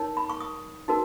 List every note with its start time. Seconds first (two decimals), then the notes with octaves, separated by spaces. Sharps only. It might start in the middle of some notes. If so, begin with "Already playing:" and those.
Already playing: D#4 A#4 C#5
0.17 B5
0.30 C#6
0.40 D#6
0.88 D#4 F#4 A#4